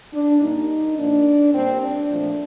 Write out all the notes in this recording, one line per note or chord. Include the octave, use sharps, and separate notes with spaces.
D4
A#2 G3 A#3 D#4
A#2 F3 A#3 D4
A#2 G3 A#3 C4
D4
A#2 F3 A3